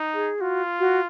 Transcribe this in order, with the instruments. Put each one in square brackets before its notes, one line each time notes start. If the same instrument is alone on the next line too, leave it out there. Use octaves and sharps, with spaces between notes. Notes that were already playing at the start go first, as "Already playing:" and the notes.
Already playing: [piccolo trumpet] D#4
[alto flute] G#4
[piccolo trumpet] F4 [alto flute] F#4
[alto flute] F#4